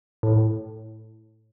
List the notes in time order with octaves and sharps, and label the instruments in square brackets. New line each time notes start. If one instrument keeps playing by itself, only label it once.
[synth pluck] A2